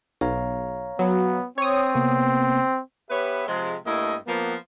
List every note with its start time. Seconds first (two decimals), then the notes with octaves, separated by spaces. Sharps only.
0.21 B1 C#5 F5 A#5
0.99 F#3 B3
1.58 C4 C#5 D#6
1.95 C3 A#3 B3
3.10 B3 G4 B4 C#5 E5
3.48 C3 F3 G#3
3.86 G2 A3 A#3 E4 D#5
4.27 F3 A#3 B3